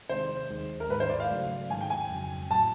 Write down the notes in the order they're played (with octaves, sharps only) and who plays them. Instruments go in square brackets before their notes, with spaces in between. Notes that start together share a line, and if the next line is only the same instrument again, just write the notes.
[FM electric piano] C3 D#3 G#3 [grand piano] C5
[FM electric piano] D#2 D#3 G#3
[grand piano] A#4
[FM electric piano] G#2 D#3 G#3 [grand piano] B4
[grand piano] C5
D5
F5
[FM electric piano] C#3 F#3 A3
[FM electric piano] G#2 D#3 G#3 [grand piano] G#5
[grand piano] G5
G#5
[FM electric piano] F2 C#3 F#3
[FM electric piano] A2 F#3 [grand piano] A5